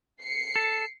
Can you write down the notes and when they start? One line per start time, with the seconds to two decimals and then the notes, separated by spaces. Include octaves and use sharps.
0.21 C7 C#7
0.56 A4